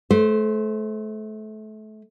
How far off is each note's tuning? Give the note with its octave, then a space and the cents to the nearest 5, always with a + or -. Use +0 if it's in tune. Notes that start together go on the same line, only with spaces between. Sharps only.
A3 -30 C5 +5